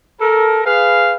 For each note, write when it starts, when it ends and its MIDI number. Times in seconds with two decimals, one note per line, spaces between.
0.21 0.63 69
0.21 0.63 70
0.65 1.16 68
0.65 1.16 71
0.65 1.16 77